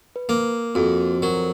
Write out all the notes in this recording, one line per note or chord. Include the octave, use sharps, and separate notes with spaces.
B4
A#3 A#4
F2 F#4
F#3 A#4